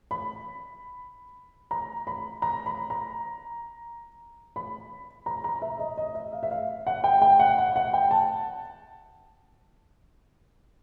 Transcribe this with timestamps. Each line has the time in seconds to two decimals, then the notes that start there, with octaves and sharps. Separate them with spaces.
0.11 B5
1.71 A#5
2.07 B5
2.42 A#5
2.66 B5
2.90 A#5
4.56 B5
5.26 A#5
5.44 A#5
5.62 E5
5.79 D#5
5.98 D#5
6.15 E5
6.33 F5
6.43 E5
6.51 F5
6.87 F#5
7.04 G5
7.22 G5
7.40 F#5
7.58 F#5
7.76 F#5
7.93 G5
8.11 A5